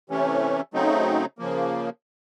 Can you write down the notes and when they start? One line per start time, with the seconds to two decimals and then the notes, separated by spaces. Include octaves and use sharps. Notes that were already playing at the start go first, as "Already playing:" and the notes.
0.10 C3 E3 A3 C#4
0.74 C#3 F#3 A3 C4 D#4
1.38 C#3 F3 A#3